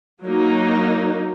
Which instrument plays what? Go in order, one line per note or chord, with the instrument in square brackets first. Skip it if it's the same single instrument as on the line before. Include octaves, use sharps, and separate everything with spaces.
[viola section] F#3 A#3 D#4